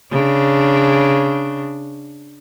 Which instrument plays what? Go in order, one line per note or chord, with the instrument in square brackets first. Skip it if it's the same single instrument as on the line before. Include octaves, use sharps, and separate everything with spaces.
[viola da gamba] C#3 D4